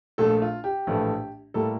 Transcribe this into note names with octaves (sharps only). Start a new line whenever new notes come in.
A#1 A#2 A3 A4
F4
G4
A#1 A2 E3 A3
A2 G3 A#3 A4